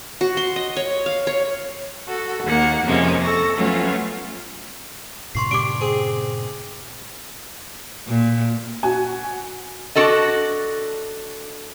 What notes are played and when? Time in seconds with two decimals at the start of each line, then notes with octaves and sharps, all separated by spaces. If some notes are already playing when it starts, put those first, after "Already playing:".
0.21 F#4
0.37 C6
0.56 D#5
0.77 C#5
1.06 F5
1.27 C#5
2.06 F#4 A4
2.44 D#2 A#3 F#5
2.85 F2 C3 F3 G#3 A#3 C#4
3.22 A4 C#6 A#6
3.56 F3 F#3 A3 B3 C#4 F4
5.35 G2 A#2 C#3 C6 C#6 C7
5.51 D4 G4 D6 D7
5.81 C4 G#4
8.07 A#2
8.83 F#4 G#5
9.95 D4 F#4 A4 D#5